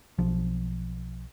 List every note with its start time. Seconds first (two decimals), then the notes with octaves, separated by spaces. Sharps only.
0.18 B1 F3